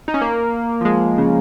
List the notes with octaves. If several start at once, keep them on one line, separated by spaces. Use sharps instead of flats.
D#4
C#4
A#3
F3
G#3
C#3